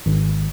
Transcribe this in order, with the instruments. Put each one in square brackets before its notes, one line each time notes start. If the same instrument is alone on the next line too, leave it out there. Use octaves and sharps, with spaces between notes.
[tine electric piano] G#1